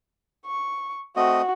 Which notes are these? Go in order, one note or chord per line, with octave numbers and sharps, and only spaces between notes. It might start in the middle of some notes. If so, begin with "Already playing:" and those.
C#6
A3 C4 F#4 D#5